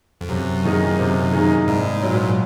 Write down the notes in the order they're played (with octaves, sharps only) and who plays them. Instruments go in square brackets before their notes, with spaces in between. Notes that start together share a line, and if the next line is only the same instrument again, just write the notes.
[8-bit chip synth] F2
[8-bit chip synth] F#2 [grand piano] C3
[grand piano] D#3 A#3 D#4 G#4
C3
D#3 A#3 D#4 G#4
[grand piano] C2 [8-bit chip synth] G#2
[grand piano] A#2 F#3